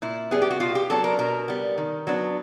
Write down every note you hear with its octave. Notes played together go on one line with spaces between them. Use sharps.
A#2 E4
G3 B3 G#4
G4
F#4
B2 F4
G4
F#3 B3 D4 A4
A#4
B2 A#4
G3 B3
D#3
F#3 B3 D4